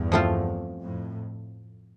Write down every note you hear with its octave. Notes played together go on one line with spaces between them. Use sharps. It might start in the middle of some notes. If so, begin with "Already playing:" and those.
Already playing: E2 G2
F3 A3 C4 F4
F2 A2